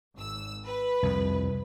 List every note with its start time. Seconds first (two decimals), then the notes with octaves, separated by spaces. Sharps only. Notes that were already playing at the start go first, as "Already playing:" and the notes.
0.15 G#1 E6
0.65 B4
1.03 C2 F2